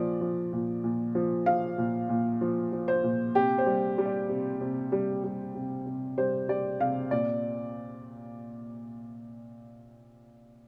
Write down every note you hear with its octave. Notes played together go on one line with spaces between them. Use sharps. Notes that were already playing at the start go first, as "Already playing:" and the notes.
Already playing: A#2 F3 D5
F3
A#2
A#2
F3
F3 F5
A#2
A#2
F3
F3
C5
A#2
C3 G4
C5
G3
G3
D5
C3
C3
G3
G3
C3
C3
G3 C5
G3 D5
C3 F5
A#2 D5